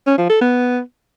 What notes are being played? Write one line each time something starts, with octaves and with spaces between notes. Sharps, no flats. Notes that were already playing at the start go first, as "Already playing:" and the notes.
C#4
F3
A4
B3